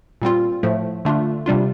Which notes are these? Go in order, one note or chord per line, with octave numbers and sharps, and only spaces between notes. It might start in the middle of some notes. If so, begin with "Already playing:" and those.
A#2 G3 C4 F4
A2 F3 A3
D3 A3 D4 F4
C3 G3 D4 F4